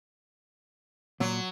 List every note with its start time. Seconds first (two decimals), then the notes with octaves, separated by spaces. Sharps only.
1.20 A#2 F#3